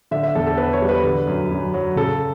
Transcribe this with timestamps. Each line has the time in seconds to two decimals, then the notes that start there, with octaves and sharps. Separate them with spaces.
0.11 D3 E5
0.23 E5
0.35 E2 A4
0.47 A4
0.57 E2 B4
0.73 C#5
0.82 G3
0.89 B4
1.04 D3
1.27 F#2
1.51 F#2
1.74 F#3
1.96 C#3 A4